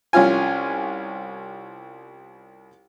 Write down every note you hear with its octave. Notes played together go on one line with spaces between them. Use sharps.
C2 C#4 F4 G#5